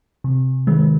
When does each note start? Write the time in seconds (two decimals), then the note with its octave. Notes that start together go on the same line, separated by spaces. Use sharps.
0.24 C3
0.67 D#3 G#3